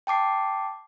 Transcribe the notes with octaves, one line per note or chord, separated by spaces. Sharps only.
G5 A5 D6 C7